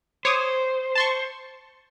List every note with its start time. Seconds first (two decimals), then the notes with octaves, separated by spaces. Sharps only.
0.25 C5 C#5 D6 D#6
0.95 A5 C6 C#6